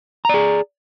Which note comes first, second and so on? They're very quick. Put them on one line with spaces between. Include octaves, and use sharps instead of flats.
A#5 D5 G#4